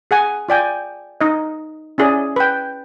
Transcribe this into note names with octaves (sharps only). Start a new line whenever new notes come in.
G#4 F#5 G#5
F4 D5 G5 G#5
D#4 D#5
C#4 E4 G#4 D5
B4 G5